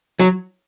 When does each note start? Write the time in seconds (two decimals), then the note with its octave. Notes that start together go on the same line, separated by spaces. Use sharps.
0.19 F#3